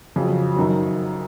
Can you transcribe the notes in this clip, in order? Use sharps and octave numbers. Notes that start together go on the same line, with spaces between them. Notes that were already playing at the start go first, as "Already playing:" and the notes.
F2 C#3 F#3
F#2 D#3 F#3